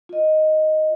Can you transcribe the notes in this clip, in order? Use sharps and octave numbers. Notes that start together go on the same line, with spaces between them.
F4 D#5